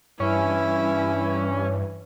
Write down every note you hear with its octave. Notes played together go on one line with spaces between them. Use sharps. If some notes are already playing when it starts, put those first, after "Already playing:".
G2 E3 C#4 E4